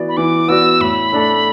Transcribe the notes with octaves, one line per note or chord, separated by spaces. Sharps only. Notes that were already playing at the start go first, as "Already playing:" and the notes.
Already playing: E3 B3 F#4 D5
B5
E3 D6
B3 F#4 D5 E6
A2 B5
A3 D4 A4